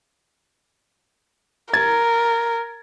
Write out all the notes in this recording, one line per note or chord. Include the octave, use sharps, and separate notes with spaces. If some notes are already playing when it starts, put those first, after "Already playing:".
A#4 G#6 A6